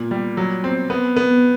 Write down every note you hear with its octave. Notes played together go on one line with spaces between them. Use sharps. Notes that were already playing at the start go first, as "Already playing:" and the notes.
Already playing: A#2
G3
F#3
C4
B3
B3